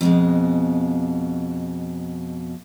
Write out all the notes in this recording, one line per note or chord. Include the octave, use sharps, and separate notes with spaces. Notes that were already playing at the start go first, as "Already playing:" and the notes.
F2 B2 G#3